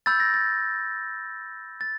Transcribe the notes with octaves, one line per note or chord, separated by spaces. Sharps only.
B5 E6 G6 A6
A#6
A6
A6